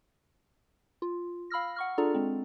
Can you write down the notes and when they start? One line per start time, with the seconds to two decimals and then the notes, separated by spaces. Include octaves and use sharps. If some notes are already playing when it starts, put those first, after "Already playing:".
1.02 F4
1.50 F5 B5 E6 F6 A#6
1.76 F#5 C#6 F6
1.98 D4 F4 G#4 A4 D5 A#5
2.14 G#3 C4